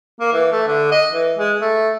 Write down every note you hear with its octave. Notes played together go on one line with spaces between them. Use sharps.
A#3
E3
A3
D3
D#5
E3
G#3
A3